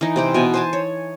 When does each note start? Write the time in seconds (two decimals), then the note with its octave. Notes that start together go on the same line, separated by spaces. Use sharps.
0.01 E3 D#4
0.16 C3 C4 G4
0.34 B2 B3 G#5
0.54 C5 G#5 A5
0.73 C#5